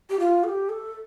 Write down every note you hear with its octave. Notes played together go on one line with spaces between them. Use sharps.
G4
F4
A4
G4
A4